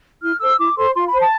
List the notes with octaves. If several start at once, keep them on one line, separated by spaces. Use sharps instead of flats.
E4 F6
A4 C5 E6
E4 D6
A4 C5 C6
F4 C6
B5
C5
A5